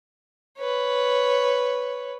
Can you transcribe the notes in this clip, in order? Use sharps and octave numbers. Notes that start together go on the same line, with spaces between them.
B4 C#5